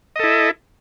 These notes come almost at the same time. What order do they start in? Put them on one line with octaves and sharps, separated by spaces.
D#5 A4 E4